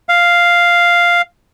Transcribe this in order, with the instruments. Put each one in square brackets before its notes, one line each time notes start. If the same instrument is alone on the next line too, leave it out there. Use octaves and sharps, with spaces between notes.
[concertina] F5